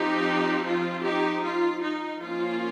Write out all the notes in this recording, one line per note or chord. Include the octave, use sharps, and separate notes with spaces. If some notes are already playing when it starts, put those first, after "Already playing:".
Already playing: F3 C4 D#4 G4
F4
D#4 G4
F4
D#4
F3 A#3 C#4 F4